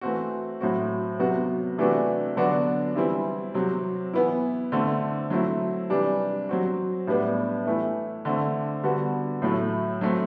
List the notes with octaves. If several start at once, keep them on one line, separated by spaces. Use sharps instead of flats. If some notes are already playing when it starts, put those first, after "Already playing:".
E3 A3 C4 F#4
A2 F#3 C4 F#4
C3 F#3 B3 F#4
C3 E3 A3 D4 F#4
D3 F#3 B3 D4 F#4
E3 G3 C4 E4
C3 F#3 C4
E3 B3 E4
D3 A3 C4
F#3 A3 C4 E4
C3 E3 G3 D4
F#3 C4 F#4
A2 G3 B3 D4
E3 A3 E4
D3 A3 C4
D3 G3 B3 F#4
A2 F#3 A3 E4
F#3 A3 C4